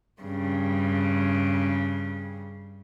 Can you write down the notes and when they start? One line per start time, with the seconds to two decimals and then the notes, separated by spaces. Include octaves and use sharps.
0.22 G2 C#3